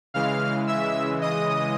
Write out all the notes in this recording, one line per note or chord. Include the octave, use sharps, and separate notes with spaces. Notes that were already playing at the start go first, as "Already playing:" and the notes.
C#3 E3 G#3 F5 F6
E5 E6
D#5 D#6